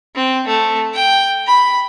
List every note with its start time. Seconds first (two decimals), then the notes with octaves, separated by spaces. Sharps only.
0.15 C4
0.47 A3
0.94 G5
1.47 B5